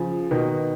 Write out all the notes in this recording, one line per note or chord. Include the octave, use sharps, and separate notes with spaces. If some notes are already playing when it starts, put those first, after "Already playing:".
Already playing: C#3 F3
B2 D#3